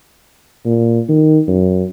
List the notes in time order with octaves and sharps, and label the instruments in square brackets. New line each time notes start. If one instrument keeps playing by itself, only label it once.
[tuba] A#2
D#3
F#2